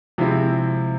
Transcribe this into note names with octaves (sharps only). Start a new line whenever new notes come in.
C3 F3 G#3 C4 E4